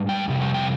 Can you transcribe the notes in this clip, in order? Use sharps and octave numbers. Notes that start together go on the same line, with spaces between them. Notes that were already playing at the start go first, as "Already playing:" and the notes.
Already playing: G#2 G3
G5
F2 C3 G3
G5
G5